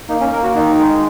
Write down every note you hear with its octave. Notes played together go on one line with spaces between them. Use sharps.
A#3 D#4
C#4
A#3 A#4
F#4
D#3 D#4
G#3